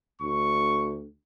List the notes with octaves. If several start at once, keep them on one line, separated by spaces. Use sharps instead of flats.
D2 C#6